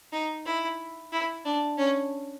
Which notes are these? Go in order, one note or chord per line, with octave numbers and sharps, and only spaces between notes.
D#4
E4
E4
D4
C#4